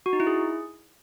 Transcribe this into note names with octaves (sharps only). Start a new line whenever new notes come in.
F#4
D#4
E4
G#4